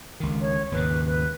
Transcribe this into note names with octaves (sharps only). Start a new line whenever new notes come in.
C#2 D#3
C#5
D#2 G#2 C#3 B4
B4